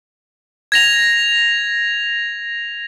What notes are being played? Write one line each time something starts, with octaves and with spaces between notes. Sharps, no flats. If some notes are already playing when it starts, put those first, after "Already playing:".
G#6 A#6 F7